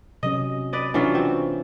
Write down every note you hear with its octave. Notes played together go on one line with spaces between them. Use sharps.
C3 F#3 C#4 D#5
B4 D5 D#5
E3 F#3 C#4 D4 F4
C4